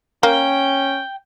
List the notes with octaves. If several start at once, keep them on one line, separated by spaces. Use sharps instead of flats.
A#3 C#4 G5